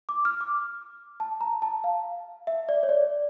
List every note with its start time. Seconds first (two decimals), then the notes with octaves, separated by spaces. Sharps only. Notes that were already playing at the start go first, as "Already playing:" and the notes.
0.09 D6
0.25 F6
0.41 D6
1.20 A5
1.41 A#5
1.62 A5
1.84 F5
2.47 E5
2.69 D5
2.83 C#5
2.89 D5